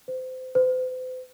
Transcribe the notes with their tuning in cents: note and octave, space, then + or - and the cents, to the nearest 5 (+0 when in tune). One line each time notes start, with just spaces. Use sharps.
C5 -30
C5 -45